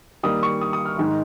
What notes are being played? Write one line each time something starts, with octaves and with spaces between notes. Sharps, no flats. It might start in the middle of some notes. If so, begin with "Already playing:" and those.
D#3 G3 A#3 D#6
C#6
D#6
D#6
F6
G#2 D#3 G#3 D#4